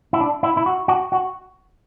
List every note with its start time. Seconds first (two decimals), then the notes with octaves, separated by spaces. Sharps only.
0.13 E4
0.20 D4
0.43 E4
0.57 E4
0.66 F#4
0.88 F#4
1.12 F#4